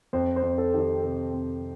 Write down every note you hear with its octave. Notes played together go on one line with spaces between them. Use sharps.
F2 C5
C5
F2
A4
D#3 G4
A4
C3 A4
F2